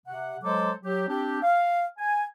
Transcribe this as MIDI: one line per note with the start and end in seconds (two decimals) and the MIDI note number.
0.07 0.37 48
0.07 0.37 78
0.43 0.71 54
0.43 0.71 56
0.43 0.71 69
0.43 0.71 72
0.43 0.71 86
0.84 1.06 54
0.84 1.06 67
1.09 1.38 60
1.09 1.38 62
1.09 1.38 67
1.42 1.84 77
1.98 2.22 80